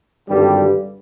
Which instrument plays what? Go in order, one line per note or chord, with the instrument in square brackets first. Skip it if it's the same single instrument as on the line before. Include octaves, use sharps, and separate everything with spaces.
[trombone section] G#1 G2 D3 G3